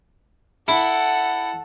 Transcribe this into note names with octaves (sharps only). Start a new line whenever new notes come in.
E4 A4 F#5